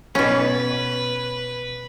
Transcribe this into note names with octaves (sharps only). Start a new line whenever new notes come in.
B2 C#4 B4